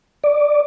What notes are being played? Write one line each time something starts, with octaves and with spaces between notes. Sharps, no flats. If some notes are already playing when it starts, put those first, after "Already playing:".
D5